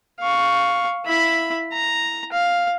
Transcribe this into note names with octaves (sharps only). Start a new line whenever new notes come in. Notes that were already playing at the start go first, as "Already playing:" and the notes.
F5 C#6
E4 B5
A#5
F5